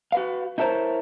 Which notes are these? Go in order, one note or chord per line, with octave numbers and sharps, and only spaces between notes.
F#4 B4 F5
D#4 E4 A4 A#4 C5 C#5